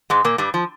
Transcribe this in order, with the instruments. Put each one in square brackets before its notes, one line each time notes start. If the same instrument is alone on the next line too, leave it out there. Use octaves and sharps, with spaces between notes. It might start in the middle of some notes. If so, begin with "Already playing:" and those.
[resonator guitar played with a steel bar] G#2 G#3
A#2 A#3
G2 G3
F3